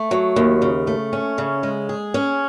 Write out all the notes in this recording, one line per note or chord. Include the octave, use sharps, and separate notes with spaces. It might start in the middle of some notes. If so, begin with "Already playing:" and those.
Already playing: A3
F#3
D#2
C#3
A3
C#4
C#3
G#3
G#4
C#4